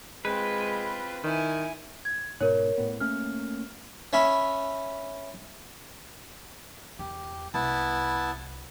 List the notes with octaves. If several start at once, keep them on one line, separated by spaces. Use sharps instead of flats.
G#3 C4 F4 B4
D#3 E4 G#5
G#6
G#2 B2 A#4 C#5
A2 B3
A3 A#3 C#4 F6
C#4 E5 B5
E2 E4 G4
C2 B3 E4 A5